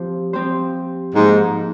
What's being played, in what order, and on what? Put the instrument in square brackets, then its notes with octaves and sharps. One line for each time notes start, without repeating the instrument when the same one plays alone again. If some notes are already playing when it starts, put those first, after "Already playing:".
Already playing: [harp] F3 C4 G4 C5
F3 C4 G4 C5
[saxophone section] G#2 [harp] F3 A#3 D#4 A#4